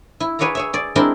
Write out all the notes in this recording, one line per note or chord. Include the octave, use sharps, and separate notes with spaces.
E4
G#4 B4 C#5 D5 F5 A#5
G#4 C#5 E5
G#4 D5
G#3 C4 D4 E4 A#4 B5